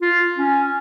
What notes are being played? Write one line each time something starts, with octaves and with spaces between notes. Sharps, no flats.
F4
C#4